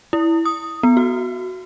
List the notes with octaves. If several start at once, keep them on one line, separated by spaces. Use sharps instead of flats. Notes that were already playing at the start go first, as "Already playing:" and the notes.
E4
D#6
B3
F#4